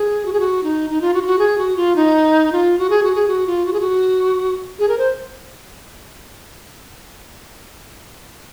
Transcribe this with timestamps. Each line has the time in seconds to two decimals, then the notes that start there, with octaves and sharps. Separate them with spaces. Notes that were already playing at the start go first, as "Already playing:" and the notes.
Already playing: G#4
0.25 F#4
0.33 G#4
0.40 F#4
0.63 D#4
0.90 D#4
1.01 F4
1.14 F#4
1.22 F4
1.26 F#4
1.39 G#4
1.58 F#4
1.76 F4
1.96 D#4
2.52 F4
2.78 F#4
2.90 G#4
3.03 F#4
3.15 G#4
3.28 F#4
3.47 F4
3.66 F#4
3.73 G#4
3.80 F#4
4.79 G#4
4.89 A#4
4.98 C5